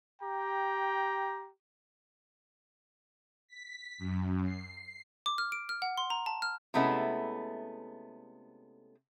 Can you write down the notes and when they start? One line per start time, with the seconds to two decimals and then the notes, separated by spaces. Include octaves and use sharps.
0.22 G4 G5 A#5
3.48 B6
3.98 F#2
4.44 C7
5.26 D6
5.38 F6
5.52 D7
5.69 F6
5.82 F#5
5.97 C6
6.10 A#5
6.26 A5
6.42 F6
6.74 C3 G#3 A3 B3 C#4 E4